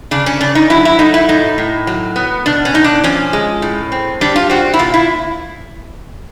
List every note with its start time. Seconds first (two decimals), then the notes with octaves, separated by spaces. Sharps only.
0.11 C#3 D4
0.26 C#4
0.41 C#3 D4
0.55 D#4
0.70 F#3 E4
0.85 E4
0.99 A3 D#4
1.14 E4
1.29 A2 D#4
1.58 A2
1.87 F#3
2.16 B3
2.46 B2 D4
2.65 C#4
2.74 B2 D#4
2.84 D4
3.04 F3 C#4
3.33 G#3
3.62 A2
3.92 C4
4.21 G3 D4
4.36 F4
4.50 C4 F#4
4.74 E4
4.79 A#2 F4
4.94 E4